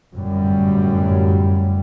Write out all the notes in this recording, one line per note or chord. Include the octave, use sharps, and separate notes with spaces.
G1 F#2 A2 G3